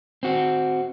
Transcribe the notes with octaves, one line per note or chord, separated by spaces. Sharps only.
C4 F#4